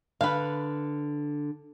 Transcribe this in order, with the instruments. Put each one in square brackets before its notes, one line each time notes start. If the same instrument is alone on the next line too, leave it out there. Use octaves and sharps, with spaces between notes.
[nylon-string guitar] D3 [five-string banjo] B4 F5